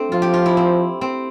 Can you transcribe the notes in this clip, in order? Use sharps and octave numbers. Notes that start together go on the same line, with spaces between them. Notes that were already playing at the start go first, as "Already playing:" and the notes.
Already playing: A3 C4 D4
F3 F4
G4
F4
E4
C4
C4